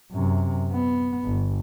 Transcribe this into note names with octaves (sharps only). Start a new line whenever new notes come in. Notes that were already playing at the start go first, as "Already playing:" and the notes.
F#2 C3
B3
G1